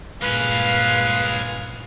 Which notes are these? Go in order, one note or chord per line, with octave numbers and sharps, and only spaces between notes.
G2 A#2 G#3 C#4 B4 F5